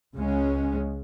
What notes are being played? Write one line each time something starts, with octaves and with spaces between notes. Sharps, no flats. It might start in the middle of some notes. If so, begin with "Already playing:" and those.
C#2 C#3 G#3 C#4